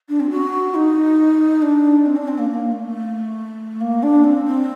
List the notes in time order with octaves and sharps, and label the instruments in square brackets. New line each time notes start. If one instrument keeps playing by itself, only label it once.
[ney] D4
C4
F#4
D#4
D4
C4
D4
C4
A#3
A#3
A3
A#3
D4
C4
C4